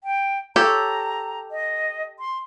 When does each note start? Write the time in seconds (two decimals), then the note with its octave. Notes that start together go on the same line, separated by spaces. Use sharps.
0.04 G5
0.56 G4 A4 C#5 A#5
1.51 D#5
2.19 C6